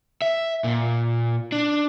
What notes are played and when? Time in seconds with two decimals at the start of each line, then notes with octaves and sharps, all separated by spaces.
0.22 E5
0.64 A#2
1.52 D4